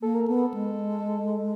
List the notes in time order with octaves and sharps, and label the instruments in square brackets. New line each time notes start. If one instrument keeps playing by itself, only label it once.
[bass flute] A#3 [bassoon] A4
[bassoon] A#4
[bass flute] B3 [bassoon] A4
[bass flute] G#3